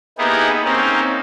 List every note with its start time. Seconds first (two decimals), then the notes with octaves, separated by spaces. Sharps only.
0.18 A#3 B3 D#4 E4 G4 G#4
0.65 A#3 C4 C#4 D#4